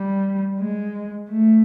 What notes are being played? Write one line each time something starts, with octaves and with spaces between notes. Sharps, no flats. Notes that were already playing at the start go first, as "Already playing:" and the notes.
Already playing: G3
G#3
A3